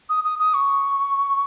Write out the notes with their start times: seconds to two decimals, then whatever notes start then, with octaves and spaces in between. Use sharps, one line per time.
0.09 D#6
0.24 D#6
0.39 D#6
0.54 C#6